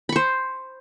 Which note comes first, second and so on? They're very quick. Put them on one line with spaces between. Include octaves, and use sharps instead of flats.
B5 C#6 C5